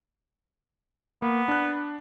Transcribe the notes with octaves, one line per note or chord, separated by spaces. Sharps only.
A#3 B3
D4 F#6